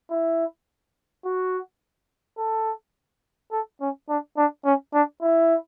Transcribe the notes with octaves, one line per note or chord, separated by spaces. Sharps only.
E4
F#4
A4
A4
C#4
D4
D4
C#4
D4
E4